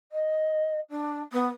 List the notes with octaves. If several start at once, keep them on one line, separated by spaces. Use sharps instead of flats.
D#5
D4
B3